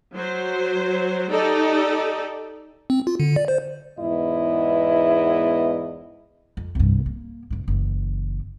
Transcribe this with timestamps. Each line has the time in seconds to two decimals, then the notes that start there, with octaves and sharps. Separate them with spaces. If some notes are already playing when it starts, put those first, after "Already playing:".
0.14 F#3 C5
1.31 D#4 G4 A4 D5
2.90 C4
3.07 F4
3.20 D3
3.36 D5
3.48 C5
3.99 E2 G#2 B3 E4 D#5
6.57 F2
6.75 C2 G2
7.06 A#3
7.50 F#1 A2
7.68 F#1 E3